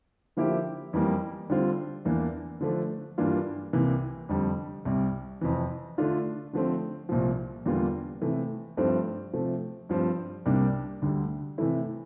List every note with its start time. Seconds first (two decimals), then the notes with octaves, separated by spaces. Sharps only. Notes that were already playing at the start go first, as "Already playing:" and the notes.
0.37 D3 F3 A#3 E4 G4
0.93 F2 E3 G3 A#3
1.49 D3 G3 C4 F4
2.05 E2 E3 A#3 D4
2.61 D3 F3 A3 D4
3.18 G2 E3 A#3 D4 F4
3.73 C2 C3 E3 A#3
4.29 F2 D3 G3
4.85 C2 C3 G3
5.41 F2 C3 E3
5.98 D3 A3 D4 F4
6.53 D3 F3 A3 C4
7.09 C2 A#2 F3
7.66 E2 D3 G3 A#3 F4
8.21 C3 E3 A3
8.77 G2 F3 A3 C4
9.33 C3 F3 A3
9.89 G2 F3 C4
10.46 C2 C3 G3 A#3 D4
11.02 D2 D3 G3
11.58 C3 E3 A3 E4